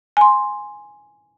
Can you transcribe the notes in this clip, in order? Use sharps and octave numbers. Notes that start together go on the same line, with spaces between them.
G#5 C6